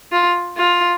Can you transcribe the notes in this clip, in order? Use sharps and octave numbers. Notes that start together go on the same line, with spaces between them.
F4
F4